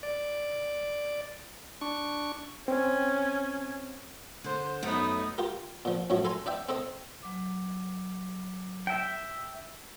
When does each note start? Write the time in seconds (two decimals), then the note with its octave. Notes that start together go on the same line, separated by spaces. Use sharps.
0.03 D5
1.81 D4 C#6
2.68 C4 C#4
4.44 D3 C5
4.83 F#2 A3 B3 D#4
5.38 F4 G4 A#4
5.85 A#2 F3
6.10 F#2 A2 F3 F#3
6.25 A4 G#5 A#5 C6
6.46 D4 D5 E5 G5
6.69 C4 A4 D#5
7.23 F#3 D6
8.87 E5 G5